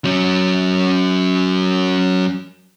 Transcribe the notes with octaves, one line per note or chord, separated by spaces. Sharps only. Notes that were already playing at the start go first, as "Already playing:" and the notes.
F#3 C#4